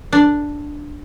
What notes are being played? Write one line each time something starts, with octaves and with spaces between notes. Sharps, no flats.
D4